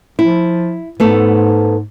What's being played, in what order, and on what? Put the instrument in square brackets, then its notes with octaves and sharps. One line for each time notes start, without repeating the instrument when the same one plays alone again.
[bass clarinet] F3 [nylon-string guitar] E4
[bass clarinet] G#2 [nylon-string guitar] A3 B3 A4